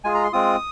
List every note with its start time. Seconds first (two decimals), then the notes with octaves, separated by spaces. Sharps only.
0.04 G#3 F4 G#4 G#5
0.15 A#5
0.24 C6
0.33 G#3 C4 F4 D#6